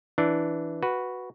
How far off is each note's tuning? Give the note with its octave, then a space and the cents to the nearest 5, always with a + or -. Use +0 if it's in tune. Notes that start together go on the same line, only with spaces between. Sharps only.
E3 +0 D4 +0
F#4 +0 B4 +0